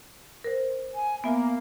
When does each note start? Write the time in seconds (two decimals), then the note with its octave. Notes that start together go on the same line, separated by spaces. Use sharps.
0.44 A#4 C5
0.94 G#5
1.24 A#3 B3 E5 G#5